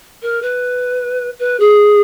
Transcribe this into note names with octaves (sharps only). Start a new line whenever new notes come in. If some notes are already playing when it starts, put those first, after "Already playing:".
A#4
B4
B4
G#4